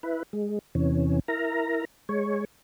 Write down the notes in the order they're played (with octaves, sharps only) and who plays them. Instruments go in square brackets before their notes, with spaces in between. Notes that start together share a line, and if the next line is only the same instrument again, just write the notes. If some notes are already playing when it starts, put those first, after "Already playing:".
[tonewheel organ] E4 B4
G#3
E2 C3 E3 C#4
E4 A#4 A#5
G#3 C#5